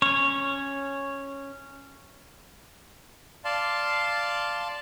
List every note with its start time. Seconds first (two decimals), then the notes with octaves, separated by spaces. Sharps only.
0.02 C#4 C#5
3.45 D5 F5 A5 C6